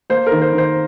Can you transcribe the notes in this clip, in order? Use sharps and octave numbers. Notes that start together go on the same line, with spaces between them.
A#3 C5
A#4
D#3
C5
D#3
C5